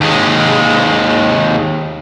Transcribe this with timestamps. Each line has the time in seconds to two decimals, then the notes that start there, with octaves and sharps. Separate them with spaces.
0.01 D#2 G#3